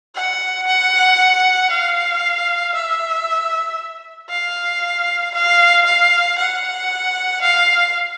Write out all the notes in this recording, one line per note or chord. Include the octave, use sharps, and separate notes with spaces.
F#5
F#5
F5
E5
F5
F5
F5
F#5
F5